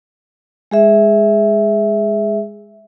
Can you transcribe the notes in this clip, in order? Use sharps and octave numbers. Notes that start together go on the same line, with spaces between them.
G#3 G#4 E5